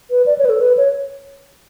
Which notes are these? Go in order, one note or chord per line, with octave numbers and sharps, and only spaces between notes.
B4
D5
C#5
B4
A4
B4
C#5